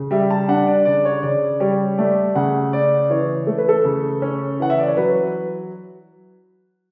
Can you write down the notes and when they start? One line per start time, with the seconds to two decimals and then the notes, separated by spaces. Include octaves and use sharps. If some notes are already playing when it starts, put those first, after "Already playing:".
Already playing: C#3
0.11 G3 E5
0.30 A5
0.48 D4 F#5
0.67 D5
0.85 C#3 D5
1.05 C#5
1.23 C#3 D5
1.60 G3 C#5
1.98 A3 D5
2.35 C#3 F#5
2.73 C#4 D5
3.10 E3 C#5
3.47 A3 A4
3.58 B4
3.69 A4
3.84 C#3
4.22 C#4
4.60 E3 F#5
4.70 E5
4.79 D5
4.88 C#5
4.97 F#3 B4